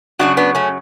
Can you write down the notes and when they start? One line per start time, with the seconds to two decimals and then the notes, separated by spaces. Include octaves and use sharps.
0.19 F#2 C#3 F#3 D4 F#4
0.37 B3 D4
0.55 A3 C#4